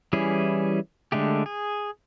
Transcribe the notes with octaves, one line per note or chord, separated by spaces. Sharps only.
E3 G3 C#4 E4 G#4
D3 G#3 A3 G4
G#4